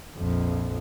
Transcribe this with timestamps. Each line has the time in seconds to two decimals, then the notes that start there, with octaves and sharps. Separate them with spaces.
0.18 A#1 F2